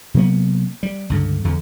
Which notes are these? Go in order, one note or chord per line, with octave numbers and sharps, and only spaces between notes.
C3 F#3 A#3 B3
G3
C#2 G2 D3
E2 D3